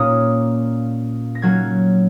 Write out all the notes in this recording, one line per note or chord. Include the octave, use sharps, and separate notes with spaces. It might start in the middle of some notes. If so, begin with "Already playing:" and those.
Already playing: A#2 A#3 C#4 D#6
A#6
F#3 A#3 C#4 G#6